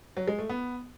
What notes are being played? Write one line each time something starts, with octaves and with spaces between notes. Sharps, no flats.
F#3
G#3
A3
B3